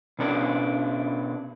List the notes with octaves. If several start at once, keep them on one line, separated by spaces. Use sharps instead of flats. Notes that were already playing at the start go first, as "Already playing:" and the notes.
B2 C#4 D4 A#4